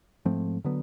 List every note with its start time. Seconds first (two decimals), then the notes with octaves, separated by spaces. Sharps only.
0.25 G#2 F3 A3 C4
0.64 D3 F#3 B3